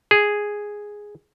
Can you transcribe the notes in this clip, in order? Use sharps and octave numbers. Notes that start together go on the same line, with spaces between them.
G#4